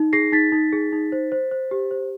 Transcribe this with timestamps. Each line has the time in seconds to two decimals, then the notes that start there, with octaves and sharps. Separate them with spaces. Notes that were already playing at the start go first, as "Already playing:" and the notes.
Already playing: D#4
0.13 G#4 A#6 C7
0.32 D#4 A6 B6
0.52 D#4
0.73 G#4
0.93 D#4
1.12 C5
1.32 C5
1.51 C5
1.71 G4
1.91 C5